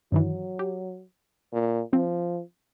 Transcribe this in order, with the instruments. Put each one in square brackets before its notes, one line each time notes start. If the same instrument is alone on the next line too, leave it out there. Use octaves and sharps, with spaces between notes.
[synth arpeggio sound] G2 D#3 E3 [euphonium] F#3
[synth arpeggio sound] G4
[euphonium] A#2
[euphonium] F3 [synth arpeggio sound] C4